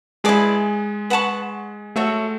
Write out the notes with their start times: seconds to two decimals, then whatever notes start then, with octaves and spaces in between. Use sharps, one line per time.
0.24 G#3 E4 G#4 B4 D5 A5
1.10 B4 F#5 A5 C#6
1.96 A3 F#4 A4 C#5 E5